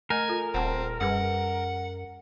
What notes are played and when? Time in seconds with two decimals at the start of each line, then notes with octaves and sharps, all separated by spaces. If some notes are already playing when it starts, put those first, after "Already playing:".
0.10 A3 A#4 D#5 G#5
0.28 F4 A4
0.54 D#1 C4 F#5 A5
1.01 F#2 G3 G#4 B4 F#5